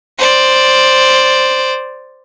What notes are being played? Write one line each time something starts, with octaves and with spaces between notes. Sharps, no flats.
C5 D5